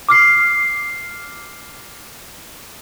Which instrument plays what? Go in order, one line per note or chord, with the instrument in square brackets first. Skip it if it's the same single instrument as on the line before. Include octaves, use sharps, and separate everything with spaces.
[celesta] D6 F6 C7